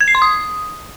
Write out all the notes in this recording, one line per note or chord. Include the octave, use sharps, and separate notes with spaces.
G#6
C7
C6
D#6